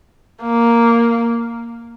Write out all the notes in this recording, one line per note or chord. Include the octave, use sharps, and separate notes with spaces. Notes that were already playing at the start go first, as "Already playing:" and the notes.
A#3